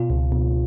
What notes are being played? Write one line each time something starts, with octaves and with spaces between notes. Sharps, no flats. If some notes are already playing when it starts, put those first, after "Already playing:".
Already playing: B2 F4
C#2
B2